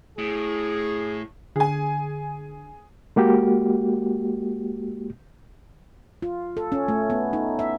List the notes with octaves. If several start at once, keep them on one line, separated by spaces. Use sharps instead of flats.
A2 G#4
D3 G#4 G#5
G#3 A#3 F#4 G4
F4
A4
C#4
A3
B3
D#4
E5